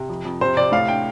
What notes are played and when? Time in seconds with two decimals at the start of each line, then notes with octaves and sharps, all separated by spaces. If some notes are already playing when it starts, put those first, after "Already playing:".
Already playing: C3
0.09 F2
0.25 F2
0.41 C3 C5
0.56 C3 D5
0.72 A2 F5
0.88 D4 G5